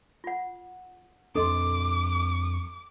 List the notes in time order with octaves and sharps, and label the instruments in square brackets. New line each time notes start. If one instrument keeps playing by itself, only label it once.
[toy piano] F4 F#5
[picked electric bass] F2 C4 D4 [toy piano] A4 D#5 C6 [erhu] D6